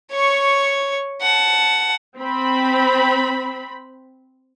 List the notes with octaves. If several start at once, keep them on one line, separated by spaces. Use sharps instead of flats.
C#5 C#6
F#5 A5
C4 B5